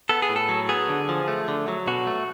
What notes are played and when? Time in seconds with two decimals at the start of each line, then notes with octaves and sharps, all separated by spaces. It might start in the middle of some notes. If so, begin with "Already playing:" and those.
0.09 B3 A4
0.22 G#4
0.29 A2
0.36 A4
0.49 F#3
0.69 B3 G#4
0.89 D3
1.09 F3
1.28 A3
1.48 D3
1.68 F#3
1.87 B2 F#4
2.07 A3